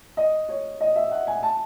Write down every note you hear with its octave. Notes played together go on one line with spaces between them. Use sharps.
D#5
C#5
D#5
E5
F#5
G#5
A5